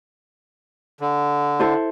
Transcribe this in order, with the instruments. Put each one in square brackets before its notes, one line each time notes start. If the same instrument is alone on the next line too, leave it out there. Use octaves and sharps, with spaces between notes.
[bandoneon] D3
[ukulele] E4 A4 C5